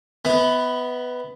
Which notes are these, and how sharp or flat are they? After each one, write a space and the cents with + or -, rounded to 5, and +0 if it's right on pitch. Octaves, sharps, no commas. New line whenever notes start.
B3 +10 E4 -40